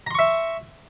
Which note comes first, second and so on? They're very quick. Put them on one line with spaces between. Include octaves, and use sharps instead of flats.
A#5 C6 C#6 E5